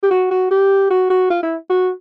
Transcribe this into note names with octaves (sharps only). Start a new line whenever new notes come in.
G4
F#4
F#4
G4
F#4
F#4
F4
E4
F#4